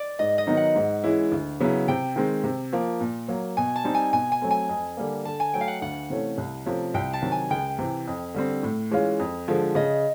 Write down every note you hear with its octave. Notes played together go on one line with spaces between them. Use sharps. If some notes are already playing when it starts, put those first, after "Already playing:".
Already playing: D5
G#2 D#5
D#5
D#3 F#3 B3 D#4
F#5
G#2
E3 G#3 C#4 E4
D2
C#3 F#3 B3 E4
C3 G5
D#3 G#3 C4
C3
F3 A#3
A#2
F#3 A#3
B2 G#5
A5
G3 C4 D#4
G#5
B2 G#5
G#5
F#3 A3 C4
G#5
F2
D3 G3 A#3
D3 A5
G#5
F#3 A3 G5
F5
F#5
D2 F#5
C3 E3 A3 C#4
C2
C3 F3 A3 C#4
C2 G5
A5
C3 D#3 F#3
G#5
C#2 G5
C3 E3
F2
D3 G3 C4
A2
E3 G#3 C#4 F4
F2
D3 F3 G#3
C#3 D#5